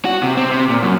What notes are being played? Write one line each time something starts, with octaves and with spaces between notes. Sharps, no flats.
F#4
C3
C4
C3
A#2
F#2